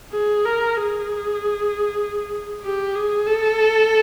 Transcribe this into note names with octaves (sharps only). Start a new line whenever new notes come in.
G#4
A#4
G#4
G4
G#4
A4